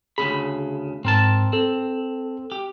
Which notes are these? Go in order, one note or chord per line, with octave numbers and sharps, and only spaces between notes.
D2 C#3 G#4 B5
G#2 C4 A#4 A5
C4 A4
G4